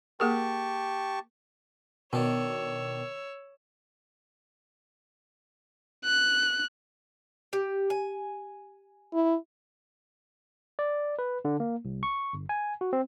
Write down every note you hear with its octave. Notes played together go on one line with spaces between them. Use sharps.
A#3 G4 G#4 A#4 A5 C#6
B2 D#3 D4 C#5 E6
F#6
G4
G#5
E4
D5
B4
D3
A#3
C2
C#6
G1
G#5
F#4
C4